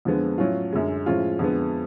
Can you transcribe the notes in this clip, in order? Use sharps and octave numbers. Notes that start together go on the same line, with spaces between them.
F2 D3 F3 G#3 B3
A2 F#3 C#4 F4
F#2 D3 G#3
A2 F3 G#3 C#4 F4
F2 D3 G#3 B3